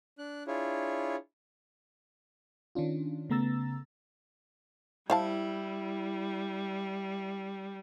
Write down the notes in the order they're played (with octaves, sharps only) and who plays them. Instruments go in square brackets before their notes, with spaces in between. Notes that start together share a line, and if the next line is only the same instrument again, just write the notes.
[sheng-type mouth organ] D4 F#6
D4 E4 F4 G#4 C#5
[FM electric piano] D#3 C#4 D4 F4
C#3 A3 B3 A#5 E6 A6
[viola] G3 [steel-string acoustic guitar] E4 [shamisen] C5 F5 A5